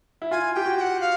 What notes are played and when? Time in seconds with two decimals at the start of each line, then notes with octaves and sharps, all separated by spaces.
0.22 E4
0.31 F4 G#5
0.54 G4 G5
0.66 F#4
0.77 G5
0.81 F#5
1.01 F5